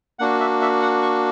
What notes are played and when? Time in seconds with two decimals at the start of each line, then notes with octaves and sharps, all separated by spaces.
0.19 A#3 D4 F#4 F#5
0.40 E5
0.62 E5
0.82 F#5
1.02 C#6